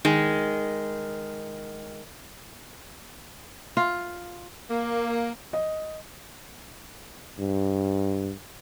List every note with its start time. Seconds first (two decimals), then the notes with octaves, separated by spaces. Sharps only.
0.05 D#3 G#3
3.77 F4
4.70 A#3
5.53 D#5
7.39 G2